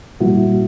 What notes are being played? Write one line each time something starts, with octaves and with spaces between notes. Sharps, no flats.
A#2 G3 A#3 E4 F#4